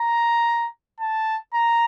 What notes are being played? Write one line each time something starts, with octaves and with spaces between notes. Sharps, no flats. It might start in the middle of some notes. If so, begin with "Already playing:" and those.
Already playing: A#5
A5
A#5